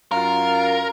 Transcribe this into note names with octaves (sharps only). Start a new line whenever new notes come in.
F#2 F4 A#4